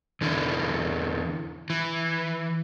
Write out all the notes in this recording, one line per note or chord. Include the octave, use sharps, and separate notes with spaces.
E2 D3 E3
E3